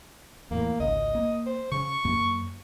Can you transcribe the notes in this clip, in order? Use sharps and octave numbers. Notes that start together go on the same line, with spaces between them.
E2 A2 A#3
G#1 C#2 D#5
A#3
C5
C#3 C#6
F#2 A#3